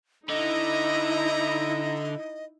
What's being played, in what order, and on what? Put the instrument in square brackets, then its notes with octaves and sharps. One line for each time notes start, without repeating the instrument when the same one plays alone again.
[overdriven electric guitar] D3 [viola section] D#4 E4 [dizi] D#5 [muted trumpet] A#5